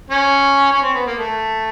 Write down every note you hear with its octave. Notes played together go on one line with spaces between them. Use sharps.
C#4
C#4
C4
B3
A#3
A3